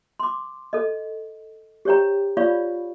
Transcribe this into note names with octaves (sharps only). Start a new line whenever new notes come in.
C6 D6
A4 D#5
G4 C5 C#5 G5 A#5
F4 C#5 D5 F5 B5 C#6